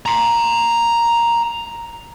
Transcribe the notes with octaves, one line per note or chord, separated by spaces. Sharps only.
A#5 C6